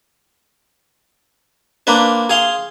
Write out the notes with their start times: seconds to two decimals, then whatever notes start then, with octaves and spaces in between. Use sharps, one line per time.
1.87 A#3 D4 B4 C5
2.30 G#4 F5 C6